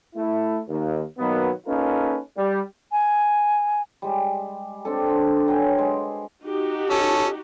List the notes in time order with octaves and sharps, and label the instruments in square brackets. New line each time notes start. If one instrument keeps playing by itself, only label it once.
[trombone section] A3 E4
D#2
B2 D#3 F#3 A#3 B3
A#3 C#4 D#4 F4 A4 B4
G3
[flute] G#5
[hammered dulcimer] G3 G#3
C4 D4 A4
D3 C4
F#3 B4 G5 G#5
G#3
[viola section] D#4 F#4 G4
[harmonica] C#4 A4